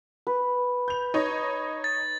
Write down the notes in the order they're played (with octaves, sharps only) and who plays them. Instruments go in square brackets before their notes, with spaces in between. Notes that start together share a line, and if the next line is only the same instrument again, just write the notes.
[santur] B4
[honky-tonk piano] G6 F7
D#4 C#5 D#5
[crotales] A6